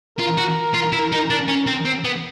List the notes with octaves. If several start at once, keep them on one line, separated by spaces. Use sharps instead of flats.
F4 A#4
F#4
F4
E4
D#4
D4
C#4
C4
C4
B3